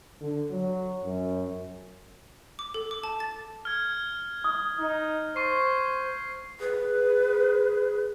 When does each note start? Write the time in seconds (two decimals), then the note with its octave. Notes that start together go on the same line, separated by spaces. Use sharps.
0.21 D3
0.51 F#3
1.04 F#2
2.59 D6
2.74 A4
2.91 D6
3.04 A5
3.20 A6
3.65 F6 G#6
4.44 D#6
4.79 D#4
5.36 C5 C#6 C7
6.60 G#4 B4